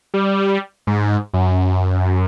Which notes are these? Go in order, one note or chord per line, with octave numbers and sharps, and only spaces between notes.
G3
G#2
F#2